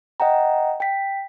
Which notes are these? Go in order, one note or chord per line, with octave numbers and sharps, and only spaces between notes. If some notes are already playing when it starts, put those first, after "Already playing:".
D#5 F#5 G5 A#5
G5 B6